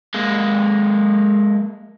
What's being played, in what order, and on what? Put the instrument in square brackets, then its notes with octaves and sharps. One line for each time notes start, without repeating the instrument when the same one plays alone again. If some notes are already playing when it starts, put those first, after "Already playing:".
[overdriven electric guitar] G#3 A#3